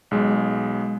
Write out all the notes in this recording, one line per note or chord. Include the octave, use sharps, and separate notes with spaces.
B1 G#3